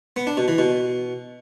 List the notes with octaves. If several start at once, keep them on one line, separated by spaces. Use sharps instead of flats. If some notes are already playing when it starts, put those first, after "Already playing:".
B3
D4
B2
E3
B2